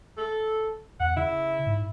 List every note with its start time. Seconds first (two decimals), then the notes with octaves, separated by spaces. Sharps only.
0.18 A4
1.00 E2 F#5
1.17 C#3 E4
1.67 G#2